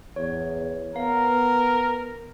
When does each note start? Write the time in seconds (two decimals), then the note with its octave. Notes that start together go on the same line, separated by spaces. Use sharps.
0.16 E2 C#5
0.96 B3 A#4 F5